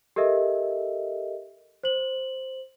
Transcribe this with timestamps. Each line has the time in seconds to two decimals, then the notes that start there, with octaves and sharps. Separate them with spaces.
0.16 G4 A4 A#4 D#5 E5
1.83 C5 F#7